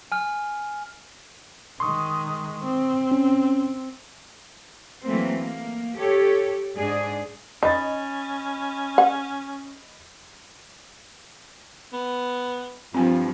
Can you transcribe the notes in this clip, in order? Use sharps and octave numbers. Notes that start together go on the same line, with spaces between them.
G#5 F6
D#3 G#3 C6 C#6 D#6
C4
C#4
E3 F#3 A3 A#3 C4
A#3
G4 A4 C#5
G#2 D4 G#4
C#4 D#4 D#5 B5 A6
F#5
B3
G2 F3 C4 G#5